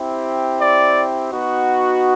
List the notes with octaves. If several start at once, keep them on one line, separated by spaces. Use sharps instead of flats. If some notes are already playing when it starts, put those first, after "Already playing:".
Already playing: C4 E4 G4
D5
B3 D#4 F#4